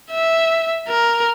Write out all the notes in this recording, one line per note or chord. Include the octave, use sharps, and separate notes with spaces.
E5
A#4